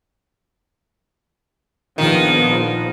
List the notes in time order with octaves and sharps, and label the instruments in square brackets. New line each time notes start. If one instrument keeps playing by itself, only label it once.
[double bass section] A#1 F3 B3 [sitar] D#3